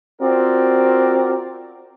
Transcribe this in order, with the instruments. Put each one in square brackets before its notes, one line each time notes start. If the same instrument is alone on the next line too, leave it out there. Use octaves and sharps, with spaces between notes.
[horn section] C4 F4 F#4 A#4 D5